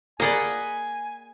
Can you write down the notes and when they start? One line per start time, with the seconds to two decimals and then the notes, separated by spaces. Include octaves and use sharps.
0.20 A#3 G#4 D5 D#5 F#5 G#5 B5